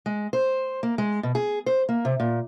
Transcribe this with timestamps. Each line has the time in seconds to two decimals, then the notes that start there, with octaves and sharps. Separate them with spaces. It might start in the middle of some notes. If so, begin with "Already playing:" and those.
0.06 G#3
0.33 C5
0.83 A#3
0.98 G#3
1.23 B2
1.35 G#4
1.66 C5
1.89 A#3
2.05 C3
2.20 A#2